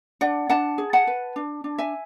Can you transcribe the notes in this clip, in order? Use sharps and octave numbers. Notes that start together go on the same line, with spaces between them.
D4 D5 F#5
D4 F#5 A5
G#4
F#5 A5
B4
D4
D4
E5 G#5